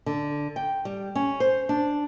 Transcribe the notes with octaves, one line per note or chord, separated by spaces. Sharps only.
D3
G5
G3
C#4
C5
D4